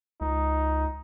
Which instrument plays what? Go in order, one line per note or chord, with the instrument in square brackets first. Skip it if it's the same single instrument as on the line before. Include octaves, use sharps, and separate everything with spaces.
[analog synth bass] C#2 [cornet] D#4